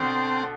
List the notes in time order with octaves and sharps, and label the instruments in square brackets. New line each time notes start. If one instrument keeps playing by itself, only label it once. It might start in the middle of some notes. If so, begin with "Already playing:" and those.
Already playing: [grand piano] B2 D3 [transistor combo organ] C4